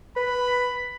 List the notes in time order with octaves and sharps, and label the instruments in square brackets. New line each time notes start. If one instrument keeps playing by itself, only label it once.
[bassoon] B4 [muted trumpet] B5